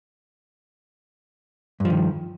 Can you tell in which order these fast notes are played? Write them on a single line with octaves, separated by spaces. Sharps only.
G2 F3 D#3